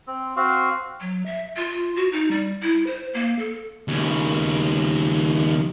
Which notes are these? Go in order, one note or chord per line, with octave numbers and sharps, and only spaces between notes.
C4
C4 F#4 F5
F#3
E5
F4
F#4
D#4
G3
E4
C5
A#3
A4
D#2 C#3